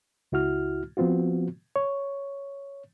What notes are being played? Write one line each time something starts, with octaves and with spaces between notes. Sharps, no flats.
C#2 E4 F#4 F6
F3 B3 C4 F4 F#4
C#5